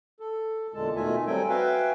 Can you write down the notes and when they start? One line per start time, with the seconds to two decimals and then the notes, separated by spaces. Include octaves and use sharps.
0.20 A4
0.74 E2 A#2 D3 G#3 A4 A5
0.96 B2 D#3 A3 F4 E5 G#5
1.27 F#3 G3 C4 A4 G5 G#5
1.49 F#4 B4 E5 F5 G5 G#5